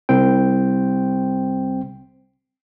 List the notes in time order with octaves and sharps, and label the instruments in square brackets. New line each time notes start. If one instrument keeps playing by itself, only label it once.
[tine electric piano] C2 C4 G5